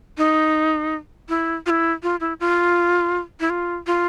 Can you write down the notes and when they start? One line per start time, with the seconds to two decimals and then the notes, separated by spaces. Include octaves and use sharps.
0.18 D#4
1.29 E4
1.66 F4
1.70 E4
2.03 F4
2.20 E4
2.40 F4
3.40 E4
3.50 F4
3.87 F4